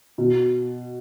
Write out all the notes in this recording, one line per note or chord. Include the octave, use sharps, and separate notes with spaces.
B2